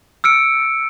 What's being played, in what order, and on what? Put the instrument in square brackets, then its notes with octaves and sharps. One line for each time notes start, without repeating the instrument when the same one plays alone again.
[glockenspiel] E6 F6 C#7 D7